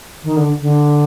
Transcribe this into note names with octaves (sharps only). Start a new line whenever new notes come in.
D#3
D3
D3